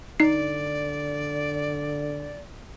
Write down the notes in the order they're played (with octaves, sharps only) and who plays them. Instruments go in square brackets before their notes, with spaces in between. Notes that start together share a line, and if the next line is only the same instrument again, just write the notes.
[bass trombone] D3 [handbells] D#4 C7 [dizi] D5